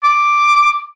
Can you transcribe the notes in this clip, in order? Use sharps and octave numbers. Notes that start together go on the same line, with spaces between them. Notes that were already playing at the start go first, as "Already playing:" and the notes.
D6